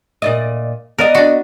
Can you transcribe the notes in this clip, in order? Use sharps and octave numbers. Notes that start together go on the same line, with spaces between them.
A#2 D5 D#5
B3 A#4 D5 D#5
D4 F#4